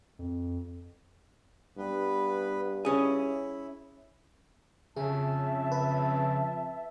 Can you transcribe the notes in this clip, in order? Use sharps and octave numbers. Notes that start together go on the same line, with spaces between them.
F2
G2 B3 B4
C#4 E4 G#4
F2 C#3 G#4 E5 A5
B4